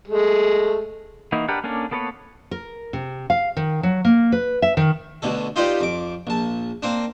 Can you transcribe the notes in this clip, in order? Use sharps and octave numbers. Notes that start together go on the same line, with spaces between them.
G#3 A3
E3 A#3 D#4 E4 F#4
D4 G4 A#4 B4 F#5
A#3 C#4 D4 A4
A#3 B3 A4 B4 C#5
A#4
C3
F5
D#3
F#3
A#3
B4
E5
D#3
D2 B2 D3 A4
D#4 F4 G4 B4 C5 D5
F2 D6
A#1 A5
A#3 C4 D4